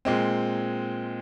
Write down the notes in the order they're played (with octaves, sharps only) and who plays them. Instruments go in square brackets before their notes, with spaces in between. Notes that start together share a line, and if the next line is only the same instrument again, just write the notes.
[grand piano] A#2 G#3 C4